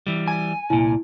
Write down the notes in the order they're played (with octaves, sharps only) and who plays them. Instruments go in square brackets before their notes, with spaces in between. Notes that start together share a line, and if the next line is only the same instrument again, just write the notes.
[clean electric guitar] E3 G3
[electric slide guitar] G#5
[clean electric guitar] C2 A#2 [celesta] E4